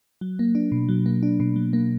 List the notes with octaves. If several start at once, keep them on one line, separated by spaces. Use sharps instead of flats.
F#3
A#3
D4
B2
F#3
A#3
D4
B2
F#3
A#3